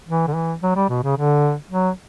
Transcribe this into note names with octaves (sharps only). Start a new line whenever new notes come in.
E3
D3
E3
F#3
G3
B2
C#3
D3
F#3